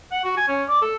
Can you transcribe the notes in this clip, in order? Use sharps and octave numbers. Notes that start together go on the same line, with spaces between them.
F#5
F#4
G#5
C#4
D5
A4